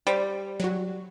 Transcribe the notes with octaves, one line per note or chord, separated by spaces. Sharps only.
G3 C5
F#3 F#4